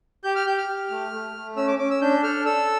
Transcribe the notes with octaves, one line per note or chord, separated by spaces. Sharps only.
G4 G6
F6
G4 G6
F6
G4
A3
A3
A3
C#4 E6
D6
C#4 D6
E6
D4 G6
A4 F6
A4 E6